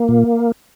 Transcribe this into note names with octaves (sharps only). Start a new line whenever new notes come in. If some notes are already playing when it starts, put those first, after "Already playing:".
Already playing: A#3
A#2